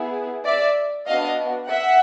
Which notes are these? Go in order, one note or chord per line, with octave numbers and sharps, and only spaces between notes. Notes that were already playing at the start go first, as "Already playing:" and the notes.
Already playing: B3 E4 G#4
D5 E5
B3 D4 F#4 D#5 F5
E5 F#5